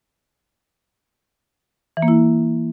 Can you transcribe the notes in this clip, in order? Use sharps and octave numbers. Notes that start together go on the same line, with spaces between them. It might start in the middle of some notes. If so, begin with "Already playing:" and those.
E3
A#3
E4